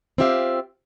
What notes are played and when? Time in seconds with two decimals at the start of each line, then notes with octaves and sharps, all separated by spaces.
0.18 C4 E4 F4 G4 E5 F5